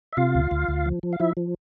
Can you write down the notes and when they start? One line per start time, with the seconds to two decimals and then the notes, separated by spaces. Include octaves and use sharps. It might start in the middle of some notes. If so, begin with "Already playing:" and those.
0.13 E5
0.17 C3 F4 F5
0.35 D2
0.51 D2
0.68 D2
0.86 F3
1.03 F3
1.13 F5
1.20 F3 E4 E5
1.37 F3